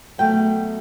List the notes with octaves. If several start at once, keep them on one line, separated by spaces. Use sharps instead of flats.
B2 F#3 A3 G5